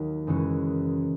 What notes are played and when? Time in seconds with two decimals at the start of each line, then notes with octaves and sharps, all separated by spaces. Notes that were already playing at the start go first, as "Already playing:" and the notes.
Already playing: D#2 D#3 F#3
0.27 F#2 C#3 E3 G#3 C#4